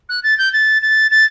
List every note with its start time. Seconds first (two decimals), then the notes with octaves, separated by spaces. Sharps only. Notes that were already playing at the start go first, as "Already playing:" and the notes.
0.09 F#6
0.23 A6
0.38 G6
0.53 A6
0.82 A6
1.11 A6